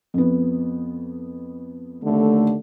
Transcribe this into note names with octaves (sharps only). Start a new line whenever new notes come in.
F2 B3
D#2 D3 A3